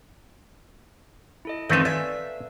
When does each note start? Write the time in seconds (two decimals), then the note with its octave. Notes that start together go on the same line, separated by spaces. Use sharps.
1.45 E4 A4 D#5
1.69 D#3 A3 C4 D#4 A4 B4 F5
1.85 D5 E5 G#5